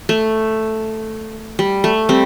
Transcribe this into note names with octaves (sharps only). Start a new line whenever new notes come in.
A3
G3
A3
G3 C4